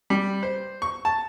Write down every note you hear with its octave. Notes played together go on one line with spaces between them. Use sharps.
G3
C5
C#6
A5